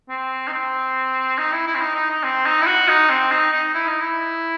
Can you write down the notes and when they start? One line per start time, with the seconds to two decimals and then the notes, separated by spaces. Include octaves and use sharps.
0.09 C4
0.48 D#4
0.52 C4
1.38 D#4
1.52 E4
1.67 E4
1.75 C4
1.81 D#4
1.95 D#4
2.10 D#4
2.24 C4
2.46 D#4
2.62 E4
2.67 F#4
2.88 D#4
3.10 C4
3.32 D#4
3.53 D#4
3.74 E4
3.88 D#4
4.01 E4